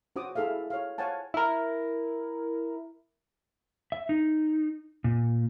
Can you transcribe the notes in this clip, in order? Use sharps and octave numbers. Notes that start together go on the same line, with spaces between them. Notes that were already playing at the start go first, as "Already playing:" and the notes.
C#4 F#4 C5 F#5 D6 D#6
E4 G#4 A4 E5 F5
C#5 F5
C5 C#5 F5 F#5 G#5 A5
E4 A#4
E5
D#4
A#2